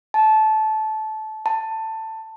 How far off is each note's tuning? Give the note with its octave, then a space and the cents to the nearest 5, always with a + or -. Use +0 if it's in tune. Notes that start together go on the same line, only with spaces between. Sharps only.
A5 -20
A5 +15